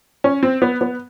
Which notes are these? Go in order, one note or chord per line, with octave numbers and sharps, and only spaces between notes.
C#4
C4
B3
B3